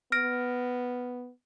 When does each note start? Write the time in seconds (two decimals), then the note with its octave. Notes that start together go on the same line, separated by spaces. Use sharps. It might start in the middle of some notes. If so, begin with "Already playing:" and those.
0.12 B3 F6 A#6 D7